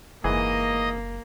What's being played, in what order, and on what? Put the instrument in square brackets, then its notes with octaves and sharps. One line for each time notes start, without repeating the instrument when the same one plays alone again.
[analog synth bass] F#1 [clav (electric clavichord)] G#2 E3 G#4 [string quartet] A#3 [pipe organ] D#5